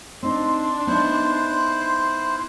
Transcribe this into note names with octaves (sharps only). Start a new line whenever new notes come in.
C4 D4 D#4 C6
B3 D#4 E4 C5 F#6